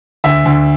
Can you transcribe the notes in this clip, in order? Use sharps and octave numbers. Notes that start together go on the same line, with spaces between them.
D2 E5
D2